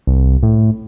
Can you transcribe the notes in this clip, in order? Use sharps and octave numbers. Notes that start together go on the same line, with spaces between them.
C2
A2